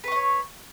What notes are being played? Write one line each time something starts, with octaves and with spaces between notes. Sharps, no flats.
B4 C#5 D#5 C#6